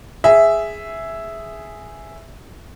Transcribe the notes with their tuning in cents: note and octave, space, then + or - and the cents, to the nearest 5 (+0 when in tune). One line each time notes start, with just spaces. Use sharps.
G#4 +0 E5 +0